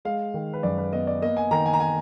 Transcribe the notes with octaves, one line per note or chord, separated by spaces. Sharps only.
G#3 F5
D#3
B4
F#2 D5
B4
B3 D#5
D5
A#3 D#5
G#5
D#3 A#5
G#5
A#5
G#5